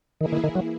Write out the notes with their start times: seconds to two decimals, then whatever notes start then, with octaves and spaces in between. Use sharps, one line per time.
0.21 D#3 E3 A#3 E4 G#4
0.32 D#3
0.44 D#3
0.55 F#3